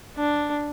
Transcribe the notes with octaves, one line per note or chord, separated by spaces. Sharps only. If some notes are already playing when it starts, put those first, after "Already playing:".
D4